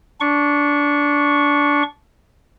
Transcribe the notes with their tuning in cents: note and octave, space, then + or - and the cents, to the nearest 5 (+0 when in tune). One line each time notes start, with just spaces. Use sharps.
D4 -15 C#6 +0